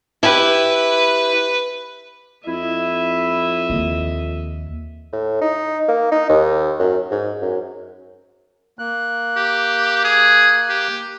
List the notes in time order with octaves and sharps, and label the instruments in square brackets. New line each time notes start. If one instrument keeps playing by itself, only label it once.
[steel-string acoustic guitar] E4 G4 [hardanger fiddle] B4
[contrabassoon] F2 [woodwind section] E4 [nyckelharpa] D#5 E5
[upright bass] D#2
[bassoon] A2
D#4
A#3
D#4
D#2
F#2
G#2
F#2
[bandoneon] A#3 F#6
[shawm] G4
G#4
G4